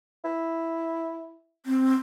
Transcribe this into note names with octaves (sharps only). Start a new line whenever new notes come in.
E4
C4